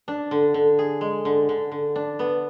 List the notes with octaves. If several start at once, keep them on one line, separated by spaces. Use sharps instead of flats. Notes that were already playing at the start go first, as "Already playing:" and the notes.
D4
D3
D3
G#4
G#3
D3
D3
D3
D4
B3